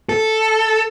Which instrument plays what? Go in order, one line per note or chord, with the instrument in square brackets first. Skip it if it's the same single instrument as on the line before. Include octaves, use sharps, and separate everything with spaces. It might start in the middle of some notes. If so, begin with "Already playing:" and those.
[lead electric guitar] A4